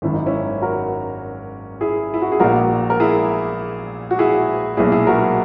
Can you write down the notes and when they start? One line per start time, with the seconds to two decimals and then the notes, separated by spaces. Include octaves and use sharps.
0.02 G#1 F#2 D#3 E4
0.14 D#4
0.26 C#4 E4
0.62 F#4 A#4
1.81 E4 G#4
2.14 E4
2.22 F#4
2.32 G#4
2.40 A#1 A#2 F#4 A#4
2.90 A#4
3.00 E4 G#4
4.11 F#4
4.19 E4 G#4
4.77 B1 A#2 E4 G#4
4.92 E4 G#4
5.07 F#4 A#4